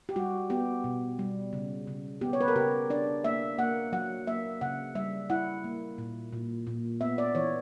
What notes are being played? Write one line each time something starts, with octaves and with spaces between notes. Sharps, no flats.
G4
G3 F#4
B3 G4
B2
G3
C#3
C#3
B3 G4
C#5
B4
A#4
C#3 G4
D4 D5
A#3 E5
A#3 F#5
F#3 F#5
A#3 E5
C#3 F#5
G3 E5
E4 F#5
A#3
A#2
A#2
A#2
B3 E5
D5
E3 C#5